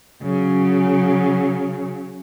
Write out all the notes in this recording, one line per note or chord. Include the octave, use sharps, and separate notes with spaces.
C#3 F#3